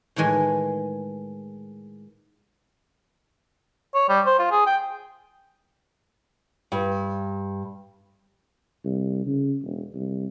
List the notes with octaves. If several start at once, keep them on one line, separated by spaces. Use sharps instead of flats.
A2 D#3 E3 G#3
C#5
G3
C5
F4
G#4
G5
G2
C2
C#3
E1
C2